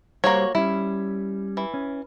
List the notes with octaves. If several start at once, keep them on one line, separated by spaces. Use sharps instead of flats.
G3 A#3 F#4 C5 C#5
G3 C#4 E4
E3
C#4